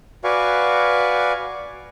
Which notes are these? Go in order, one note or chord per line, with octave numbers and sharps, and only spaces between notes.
F#4 B4 D5 F5 G#5 C#6